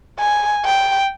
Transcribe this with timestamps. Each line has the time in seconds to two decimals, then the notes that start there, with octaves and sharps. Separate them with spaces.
0.20 G#5
0.65 G5